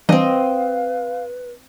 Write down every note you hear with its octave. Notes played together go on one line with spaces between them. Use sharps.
E3 G3 C4 D4 B4 D#5 F5